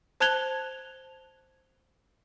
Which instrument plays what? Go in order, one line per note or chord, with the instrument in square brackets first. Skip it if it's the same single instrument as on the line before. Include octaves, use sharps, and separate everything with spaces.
[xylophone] C5 A5 F#6 G#6 F7 G7